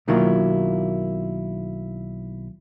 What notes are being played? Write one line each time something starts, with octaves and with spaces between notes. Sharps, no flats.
B1 D#3 F#3 A#3 E4 F4